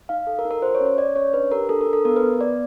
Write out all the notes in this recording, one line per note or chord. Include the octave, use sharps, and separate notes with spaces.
D#4 F5
A4
A#4
D#4
A#4
F#4 C5
C#5
C#4
C#5
C#4 D5
C#4 C#5
D4 B4
G4 A#4
D4 A4
A#4
D4
A4
B3 A#4
B4
B3
B3 D5